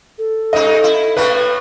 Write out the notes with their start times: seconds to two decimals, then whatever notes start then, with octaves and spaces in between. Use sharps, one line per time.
0.18 A4
0.53 G2 D#4 D#5
0.84 E4
1.17 A2 A3 A#3 B4